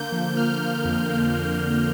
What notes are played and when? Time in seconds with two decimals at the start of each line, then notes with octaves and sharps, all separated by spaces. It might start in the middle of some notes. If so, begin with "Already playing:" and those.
Already playing: D3 A#3 G6
0.12 F3 G6
0.37 A#3 F6
0.61 F3
0.85 F2
1.09 A#3
1.33 A#3
1.57 F2